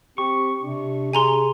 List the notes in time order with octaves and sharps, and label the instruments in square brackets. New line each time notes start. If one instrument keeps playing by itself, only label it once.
[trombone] C4 [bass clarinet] G4 [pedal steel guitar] C#6
[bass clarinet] C3 [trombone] D4
[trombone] G#4 [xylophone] G#5 A#5 C6